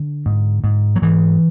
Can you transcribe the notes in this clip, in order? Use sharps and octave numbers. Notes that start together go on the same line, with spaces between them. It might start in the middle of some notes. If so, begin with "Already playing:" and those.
Already playing: D3
G#2
G#2
F#3
G#2 E3